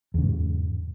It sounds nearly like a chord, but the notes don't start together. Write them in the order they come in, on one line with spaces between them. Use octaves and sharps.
E2 C#3 G#2